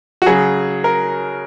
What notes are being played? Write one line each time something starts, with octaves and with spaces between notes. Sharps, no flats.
F#4
C#3 F#3 G#4
A#4